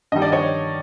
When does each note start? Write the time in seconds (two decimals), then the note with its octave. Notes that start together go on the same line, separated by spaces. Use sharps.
0.12 G2 D#3 G3 D#5
0.22 D5
0.32 C#5 D#5